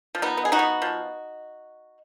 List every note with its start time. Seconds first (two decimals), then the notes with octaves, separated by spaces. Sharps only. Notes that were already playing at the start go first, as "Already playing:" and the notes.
0.15 F3
0.22 B3 D#4
0.37 B3
0.45 G#4
0.52 D#4 F#4
0.59 B3
0.82 F3